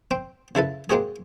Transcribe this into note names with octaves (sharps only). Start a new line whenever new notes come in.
C4 G5
C#3 E4 A4 B4
G#3 A#3 C4 F#4 G#4